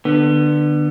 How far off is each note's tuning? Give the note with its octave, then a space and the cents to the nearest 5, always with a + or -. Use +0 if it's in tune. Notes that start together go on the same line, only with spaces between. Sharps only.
D3 +25 B3 +0